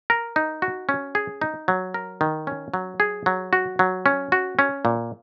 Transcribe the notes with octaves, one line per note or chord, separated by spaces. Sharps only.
A#4
D#4
F#4
C#4
G#4
D#4
F#3
A#4
D#3
C#4
F#3
G#4
F#3
F#4
F#3
C#4
F#4
C#4
A#2